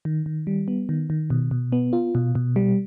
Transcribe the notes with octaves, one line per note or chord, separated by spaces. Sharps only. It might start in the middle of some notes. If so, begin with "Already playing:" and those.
D#3
D#3
G3
B3
D#3
D#3
B2
B2
B3
F4
B2
B2
G3